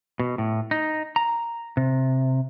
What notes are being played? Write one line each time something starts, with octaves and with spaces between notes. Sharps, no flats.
B2
A2
D#4
A#5
C3